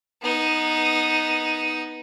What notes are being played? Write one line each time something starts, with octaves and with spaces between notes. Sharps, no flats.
B3 D#4